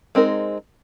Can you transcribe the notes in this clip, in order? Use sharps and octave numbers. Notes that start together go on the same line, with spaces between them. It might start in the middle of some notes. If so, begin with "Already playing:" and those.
G#3 C4 D#4 A#4